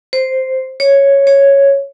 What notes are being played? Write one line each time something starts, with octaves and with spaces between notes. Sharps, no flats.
C5
C#5
C#5